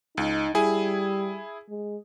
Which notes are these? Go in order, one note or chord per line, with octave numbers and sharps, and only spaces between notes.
C#2 D#4
G3 E4 G#4 G#5
G#3